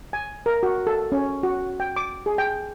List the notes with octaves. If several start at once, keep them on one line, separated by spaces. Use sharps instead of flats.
G#5
A#4
F#4
A4
C#4
F#4
G5
D6
G#4
G5